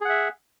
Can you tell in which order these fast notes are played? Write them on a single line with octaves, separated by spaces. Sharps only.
G#4 F#5 E5